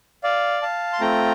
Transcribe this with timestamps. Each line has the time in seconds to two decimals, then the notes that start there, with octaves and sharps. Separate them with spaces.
0.23 D5 F5
0.62 F5 A5
0.93 C6
1.00 A3 C4 F4 G5 A#5